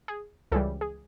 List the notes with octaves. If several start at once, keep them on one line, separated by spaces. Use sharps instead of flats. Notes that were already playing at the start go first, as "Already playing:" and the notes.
G#4
C#2 C#3 E3 G3 A4
G#4